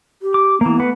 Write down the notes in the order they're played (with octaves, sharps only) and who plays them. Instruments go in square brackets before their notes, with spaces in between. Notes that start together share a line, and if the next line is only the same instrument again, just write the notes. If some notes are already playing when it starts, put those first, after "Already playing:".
[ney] G4
[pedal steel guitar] D6
[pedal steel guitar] E3 A#3 [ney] B3
[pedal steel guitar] A3 B4 F#5